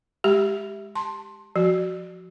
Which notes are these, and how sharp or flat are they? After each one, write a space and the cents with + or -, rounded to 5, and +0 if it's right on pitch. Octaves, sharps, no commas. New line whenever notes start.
G#3 +0 G4 +0
A5 +15 C6 +10
F3 +0 F#4 +15